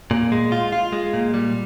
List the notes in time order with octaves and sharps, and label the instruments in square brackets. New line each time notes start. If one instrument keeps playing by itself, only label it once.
[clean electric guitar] A#2
G#3
F4
F4
G#3
A#2
G3